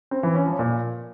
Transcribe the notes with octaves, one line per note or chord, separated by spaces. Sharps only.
C4
E3
C#4
F3
A#2